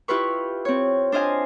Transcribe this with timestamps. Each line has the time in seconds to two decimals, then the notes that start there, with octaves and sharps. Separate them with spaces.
0.08 E4 F4 G4 B4 C#6
0.65 C4 C#5
1.12 D4 C5 D#5 F5 G#5